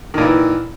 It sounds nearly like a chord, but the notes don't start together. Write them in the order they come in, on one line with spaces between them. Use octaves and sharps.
D#3 A#2 E3